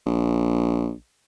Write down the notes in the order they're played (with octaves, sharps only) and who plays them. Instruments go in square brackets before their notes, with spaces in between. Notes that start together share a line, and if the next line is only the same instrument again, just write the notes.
[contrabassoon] A#1